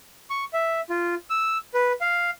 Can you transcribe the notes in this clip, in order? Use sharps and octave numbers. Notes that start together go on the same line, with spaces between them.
C#6
E5
F4
E6
B4
F5